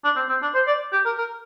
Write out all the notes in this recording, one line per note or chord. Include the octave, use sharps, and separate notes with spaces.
D4
C4
C4
D4
C5
D5
G4
A#4
A#4